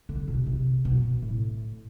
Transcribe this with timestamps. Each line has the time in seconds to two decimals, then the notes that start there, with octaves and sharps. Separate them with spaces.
0.09 D3
0.28 B2
0.46 C3
0.85 B2
1.22 A2